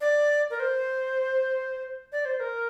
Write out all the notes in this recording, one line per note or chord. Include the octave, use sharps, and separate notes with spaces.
D5
A#4
C5
D5
C5
C5
A#4